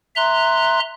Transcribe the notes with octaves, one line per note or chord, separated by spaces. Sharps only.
E5 A#5 C6 F#6